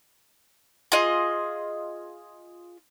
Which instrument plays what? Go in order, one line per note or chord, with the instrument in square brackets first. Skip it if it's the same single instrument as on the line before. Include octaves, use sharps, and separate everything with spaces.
[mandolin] F4 G#4 D#5